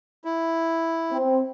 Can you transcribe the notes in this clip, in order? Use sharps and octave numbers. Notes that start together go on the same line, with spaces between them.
E4
C4